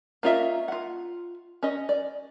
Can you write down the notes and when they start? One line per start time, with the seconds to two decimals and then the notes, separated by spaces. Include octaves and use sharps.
0.23 A#3 C#4 F4 D#5 E5
0.68 F4 F#5
1.63 C#4 D#5
1.89 D5